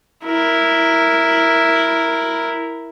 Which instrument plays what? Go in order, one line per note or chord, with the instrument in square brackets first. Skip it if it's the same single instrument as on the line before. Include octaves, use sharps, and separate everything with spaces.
[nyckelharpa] E4 A#4